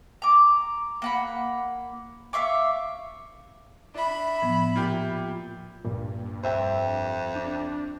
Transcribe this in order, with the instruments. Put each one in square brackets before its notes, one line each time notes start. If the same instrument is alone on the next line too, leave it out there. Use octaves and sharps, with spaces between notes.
[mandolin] A#5 D6
A#3 F#5 B5
E5 F5 C#6 D6
[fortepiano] D4 [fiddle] E5 B5
[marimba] A2 F3 B3
[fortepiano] A#2 G4
[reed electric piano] C#2 A#2 [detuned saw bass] G2
[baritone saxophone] F2 [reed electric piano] C5 E5 G5
[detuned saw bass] D4